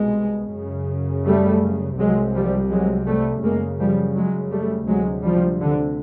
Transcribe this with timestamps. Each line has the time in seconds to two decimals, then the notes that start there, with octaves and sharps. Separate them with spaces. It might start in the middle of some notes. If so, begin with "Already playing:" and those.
Already playing: C2 B2 G#3
0.53 F#2 C#3
1.26 G3 A3
1.98 C2 C3 F#3 G#3
2.35 F3 G3
2.71 F#3 G#3
3.06 G3 A3
3.43 F#2 C#3 G#3 A#3
3.79 F3 G3
4.15 F#3 G#3
4.52 G3 A3
4.87 D2 C3 F#3 G#3
5.24 F3 G3
5.60 D3